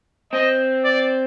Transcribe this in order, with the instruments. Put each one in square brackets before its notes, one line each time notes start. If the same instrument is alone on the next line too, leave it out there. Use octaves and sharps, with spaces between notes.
[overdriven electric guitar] C4 [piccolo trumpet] D#5
[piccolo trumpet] D5